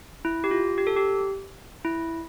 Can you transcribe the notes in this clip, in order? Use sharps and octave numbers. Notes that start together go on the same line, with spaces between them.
E4
G4
F4
G4
A4
G4
E4